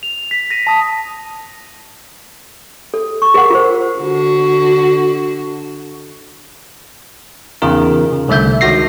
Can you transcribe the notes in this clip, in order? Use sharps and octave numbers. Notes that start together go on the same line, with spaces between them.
F7
B6
A#6 D#7
A5 D#6
A4
C#6
G#4 A#4 F5 F#5
F4 A#4 C5
D3 F#4
E2 C#3 D#4 F4 A#4
C#3
C2 D3 A3 E5 G6
C#2 D#3 F#4 A#6 C7